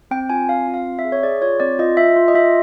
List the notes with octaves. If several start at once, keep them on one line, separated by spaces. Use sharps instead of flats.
C4 G5
F4 G#5
C4 F5
F4
F5
C4
E5
G#4
C#5
G#4 D5
F4 C#5
C4 D5
F4 D#5
F4 E5
F4
D#5
F4 E5